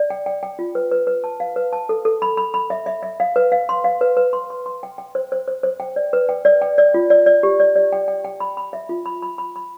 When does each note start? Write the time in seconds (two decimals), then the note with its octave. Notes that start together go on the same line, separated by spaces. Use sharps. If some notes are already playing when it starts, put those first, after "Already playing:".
Already playing: D5
0.10 G5
0.26 G5
0.43 G5
0.59 F4
0.75 B4
0.92 B4
1.07 B4
1.24 A5
1.40 F5
1.56 B4
1.73 A5
1.89 A4
2.05 A4
2.22 B5
2.37 B5
2.54 B5
2.70 E5
2.86 E5
3.03 E5
3.20 F5
3.36 B4
3.52 F5
3.69 C6
3.84 F5
4.01 B4
4.17 B4
4.33 C6
4.50 C6
4.66 C6
4.83 G5
4.98 G5
5.15 C5
5.32 C5
5.48 C5
5.63 C5
5.80 G5
5.96 D5
6.13 B4
6.29 G5
6.45 D5
6.62 G5
6.78 D5
6.94 F4
7.10 D5
7.26 D5
7.43 G4
7.60 D5
7.76 D5
7.93 G5
8.08 G5
8.25 G5
8.40 B5
8.57 B5
8.73 E5
8.89 F4
9.06 B5
9.22 B5
9.38 B5
9.56 B5